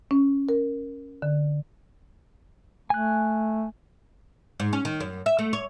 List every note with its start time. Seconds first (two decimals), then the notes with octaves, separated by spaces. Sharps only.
0.11 C#4
0.49 A#4
1.22 D3
2.90 A3 G#5 F#6
4.60 G#2
4.73 C#4
4.85 D#3
5.00 F#2
5.26 E5
5.39 A3
5.53 C#5